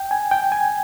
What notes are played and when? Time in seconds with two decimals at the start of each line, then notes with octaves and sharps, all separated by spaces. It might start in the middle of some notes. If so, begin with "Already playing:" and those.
Already playing: G5
0.11 G#5
0.31 G5
0.52 G#5